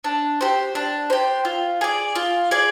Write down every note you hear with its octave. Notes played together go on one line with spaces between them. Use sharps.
D4
G4 C5
D4
G4 C5
F4
G#4 D5
F4
G#4 D5